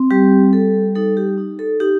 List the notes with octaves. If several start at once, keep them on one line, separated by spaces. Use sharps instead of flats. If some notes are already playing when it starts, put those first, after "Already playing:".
Already playing: C4
G3 G4
G3 A4
D#4 A4
G4
D#4
A4
D#4 G4